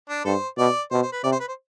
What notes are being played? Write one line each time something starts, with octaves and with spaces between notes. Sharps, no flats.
D4
G2 A4 C5
B2 D5
B2 C5
C5
B4
C3 D5
C5
B4
C5